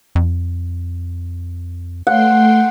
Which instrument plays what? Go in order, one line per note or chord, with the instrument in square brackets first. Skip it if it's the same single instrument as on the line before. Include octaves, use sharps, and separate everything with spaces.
[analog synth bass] F2
[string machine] A3 G5 C6 [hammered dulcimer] F#5